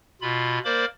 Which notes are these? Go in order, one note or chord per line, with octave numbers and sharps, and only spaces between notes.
B2 F4 B5
A#3 A#4 C5 D5 B5 D6